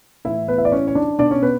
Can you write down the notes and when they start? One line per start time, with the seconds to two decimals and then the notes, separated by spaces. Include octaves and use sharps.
0.25 A2 E3 E4 E5
0.48 B3 B4
0.58 E5
0.65 D5
0.72 C#4 C#5
0.87 C#5
0.95 D4 D5
1.19 B2 D4 D5
1.31 C#4 C#5
1.42 B3 B4